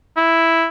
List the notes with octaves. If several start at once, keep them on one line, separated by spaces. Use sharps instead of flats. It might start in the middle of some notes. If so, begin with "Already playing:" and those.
E4